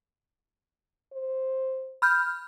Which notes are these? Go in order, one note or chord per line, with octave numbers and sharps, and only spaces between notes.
C5
B5 F6 G6